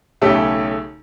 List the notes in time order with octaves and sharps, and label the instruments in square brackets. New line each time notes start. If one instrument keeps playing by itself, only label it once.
[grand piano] B1 C#3 A3 C#4 G4 E5